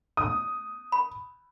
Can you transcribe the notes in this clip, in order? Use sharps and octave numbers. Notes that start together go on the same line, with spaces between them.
D#6
B5